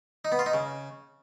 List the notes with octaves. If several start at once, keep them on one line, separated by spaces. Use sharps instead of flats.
D#4
B3
F4
D#4
C#3